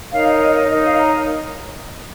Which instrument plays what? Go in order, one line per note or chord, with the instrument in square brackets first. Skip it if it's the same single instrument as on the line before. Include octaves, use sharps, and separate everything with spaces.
[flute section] D#4 A#4 C#5 F5
D#5
D#5
D#5
D#4 A#4 C#5 D#5
F5
A#5